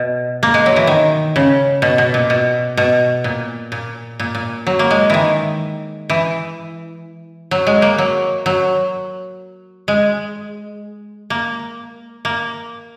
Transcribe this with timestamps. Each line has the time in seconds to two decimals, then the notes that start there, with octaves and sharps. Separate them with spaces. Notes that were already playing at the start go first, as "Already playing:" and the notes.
Already playing: B2
0.43 A#3
0.54 G#3
0.66 F#3
0.76 E3
0.87 D#3
1.36 C#3
1.82 B2
1.98 B2
2.14 A#2
2.30 B2
2.77 B2
3.24 A#2
3.72 A#2
4.20 A#2
4.35 A#2
4.67 F#3
4.79 A#3
4.91 G#3
5.10 D#3 E3
6.10 E3
7.51 F#3
7.67 G#3
7.82 A#3
7.98 F#3
8.46 F#3
9.88 G#3
11.30 A#3
12.25 A#3